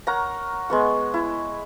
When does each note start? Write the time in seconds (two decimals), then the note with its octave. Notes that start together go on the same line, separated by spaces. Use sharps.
0.07 A#4 C#5 F#5 A#5
0.70 G#3 B3 C#6
1.14 E4